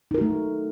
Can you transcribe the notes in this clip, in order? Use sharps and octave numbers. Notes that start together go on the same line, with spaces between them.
A3 D#4 F#4 A#4